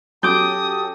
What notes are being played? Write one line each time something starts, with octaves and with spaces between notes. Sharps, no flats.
F#3 C#4 G4 A4 D6 D#6 G6